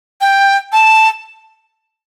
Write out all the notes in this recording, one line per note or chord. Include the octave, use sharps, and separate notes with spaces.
G5
A5